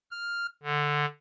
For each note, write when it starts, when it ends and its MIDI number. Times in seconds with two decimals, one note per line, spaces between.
0.11 0.46 89
0.63 1.06 50